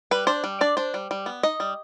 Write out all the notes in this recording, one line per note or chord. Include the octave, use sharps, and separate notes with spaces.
G3 B4
D4 C5
G3
D4 D5
D4 C5
G3
G3
B3
D#4 D#5
G3